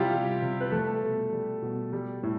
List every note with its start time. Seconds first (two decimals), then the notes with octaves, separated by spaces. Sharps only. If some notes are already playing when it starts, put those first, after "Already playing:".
Already playing: C3 G3 E4 F4 G4
0.13 G3
0.42 C3
0.60 B4
0.72 G3 A3 A4
1.03 B2
1.33 G3
1.62 B2
1.93 G3
2.23 A2